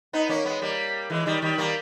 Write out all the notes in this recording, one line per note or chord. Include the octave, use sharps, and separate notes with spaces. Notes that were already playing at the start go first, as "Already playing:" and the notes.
B3 D#4
A#3 C#4
G#3 B3
G3 A#3
E3 G#3
D#3 G3
D#3 G3
G3 A#3